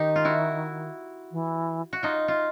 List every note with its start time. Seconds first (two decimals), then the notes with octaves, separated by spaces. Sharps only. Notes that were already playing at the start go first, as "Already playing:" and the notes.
Already playing: D#3 D#4 G4
0.16 F4
0.25 E4 F#4
1.32 E3
1.93 F#4
2.03 D#4 F4
2.28 F4